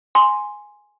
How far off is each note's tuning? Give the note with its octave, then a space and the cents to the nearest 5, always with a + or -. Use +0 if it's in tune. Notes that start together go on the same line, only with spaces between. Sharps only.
G#5 +0 C6 +0